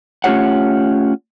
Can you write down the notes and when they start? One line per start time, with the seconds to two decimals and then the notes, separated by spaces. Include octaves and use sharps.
0.24 A3 C#4 F4 G4 C#5 F#5